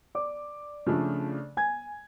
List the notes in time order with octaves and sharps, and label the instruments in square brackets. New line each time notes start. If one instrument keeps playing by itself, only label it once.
[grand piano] D5 D6
[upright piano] C#3 F3 A3 D4
[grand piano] G#5 G#6